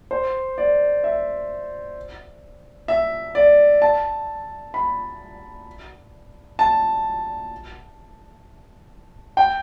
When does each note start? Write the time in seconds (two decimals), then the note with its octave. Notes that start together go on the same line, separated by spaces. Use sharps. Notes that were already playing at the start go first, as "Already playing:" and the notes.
0.11 C5
0.58 D5
1.04 E5
2.88 E5
3.35 D5
3.82 A5
4.74 B5
6.59 A5
9.37 G5